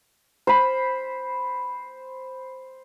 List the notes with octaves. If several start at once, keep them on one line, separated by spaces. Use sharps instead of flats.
C5 B5